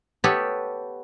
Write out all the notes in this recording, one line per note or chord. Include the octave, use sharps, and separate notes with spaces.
B3 G4 A4 B4 C#5